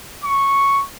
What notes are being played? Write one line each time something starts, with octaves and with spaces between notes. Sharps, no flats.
C#6